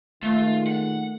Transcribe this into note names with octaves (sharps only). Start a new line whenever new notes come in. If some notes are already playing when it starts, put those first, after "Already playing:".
A#2 D#3 G#3 A3 F4
F#5